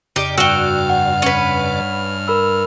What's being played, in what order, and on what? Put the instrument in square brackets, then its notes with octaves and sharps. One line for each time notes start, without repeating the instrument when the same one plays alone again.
[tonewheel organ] F2 C#3 D5 [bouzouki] D#4 G4
[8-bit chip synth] G2 F6 [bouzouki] F#4 G5 [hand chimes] E6
[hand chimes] F#5
[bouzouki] C#4 B4
[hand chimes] A#4 B5 E6